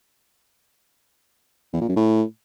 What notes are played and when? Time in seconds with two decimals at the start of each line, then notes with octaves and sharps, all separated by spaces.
1.73 E2
1.81 A#2
1.89 F#2
1.96 A2